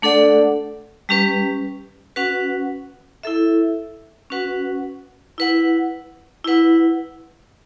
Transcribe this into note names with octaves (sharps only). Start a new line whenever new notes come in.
A3 D4 A4 D5 F#5
G3 C#4 G4 B4
C#4 F#4 B4 F#5
E4 A4 E5
C#4 F#4 B4 F#5
E4 B4 F#5
E4 B4 F#5